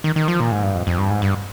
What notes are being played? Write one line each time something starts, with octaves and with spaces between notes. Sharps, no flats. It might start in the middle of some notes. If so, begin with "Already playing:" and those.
D#3
D#3
F3
A#2
G#2
G2
F2
F2
G2
G#2
G2